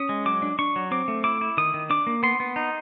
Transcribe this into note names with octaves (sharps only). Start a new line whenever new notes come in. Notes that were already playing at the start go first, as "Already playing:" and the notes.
Already playing: C#4 D#6
G#3
F#3 D6
D4
D4 C#6
F#3
C4 D6
A3
E4 D6
E4
D#3 D#6
D#3
D4 D6
A#3
B3 C6
B3
D#4